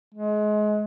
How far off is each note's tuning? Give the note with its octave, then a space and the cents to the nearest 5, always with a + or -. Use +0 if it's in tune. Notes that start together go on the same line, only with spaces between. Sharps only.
G#3 +30